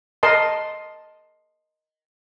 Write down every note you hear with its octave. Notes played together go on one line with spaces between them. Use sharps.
A#4 D#5 A5 C6